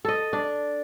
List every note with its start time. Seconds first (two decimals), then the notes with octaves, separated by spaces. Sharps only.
0.05 A4 D#5
0.33 D4